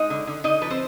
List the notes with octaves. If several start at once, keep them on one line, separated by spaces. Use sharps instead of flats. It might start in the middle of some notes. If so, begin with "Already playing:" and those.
Already playing: G#3 D#4 D#5
D3
D3
D3 D#4 D#5
F3 B4
C4 C5